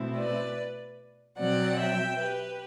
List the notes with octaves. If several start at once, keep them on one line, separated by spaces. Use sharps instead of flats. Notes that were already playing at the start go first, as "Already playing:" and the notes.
Already playing: B2 A3 C4 E4
B4 D5
B2 F#3 C4 D5 F#5
E5 G5
G4 B4